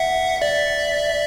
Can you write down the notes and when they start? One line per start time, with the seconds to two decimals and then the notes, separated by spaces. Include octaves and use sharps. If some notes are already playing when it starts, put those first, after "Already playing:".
Already playing: E5 F#5
0.41 D5 E5